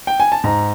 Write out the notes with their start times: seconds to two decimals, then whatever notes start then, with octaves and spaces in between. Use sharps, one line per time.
0.07 G5
0.20 G#5
0.32 A5
0.44 G#2 A#5